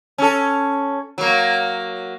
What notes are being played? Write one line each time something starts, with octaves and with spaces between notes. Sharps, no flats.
C#4 A4
F#3 A#3